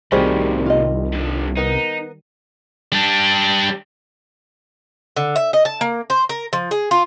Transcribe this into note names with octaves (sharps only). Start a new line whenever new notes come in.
C2 A2 C3 D#3 G3 F#4 G#4 C5
F4 D#5
G2 D3
B3 D#4 A#4
G3 D4
D3
E5
D#5
A5
A#3
C5
A#4
F3
G#4
F4